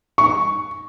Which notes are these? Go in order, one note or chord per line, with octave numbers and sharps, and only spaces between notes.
C#6